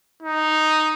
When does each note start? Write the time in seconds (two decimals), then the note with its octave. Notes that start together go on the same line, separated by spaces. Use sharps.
0.23 D#4